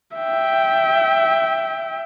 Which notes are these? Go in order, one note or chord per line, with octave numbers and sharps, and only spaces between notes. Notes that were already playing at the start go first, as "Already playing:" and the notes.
E5 G5